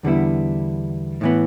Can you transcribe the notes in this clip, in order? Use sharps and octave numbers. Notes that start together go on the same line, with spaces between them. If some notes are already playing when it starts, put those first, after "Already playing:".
E2 D3 G3 B3 E4
A2 E3 B3